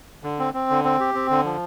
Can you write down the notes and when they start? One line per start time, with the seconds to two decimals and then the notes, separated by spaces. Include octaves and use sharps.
0.24 D3
0.39 C4
0.54 C4
0.70 D3
0.84 C4
1.00 G4
1.14 C4
1.30 D3
1.44 F3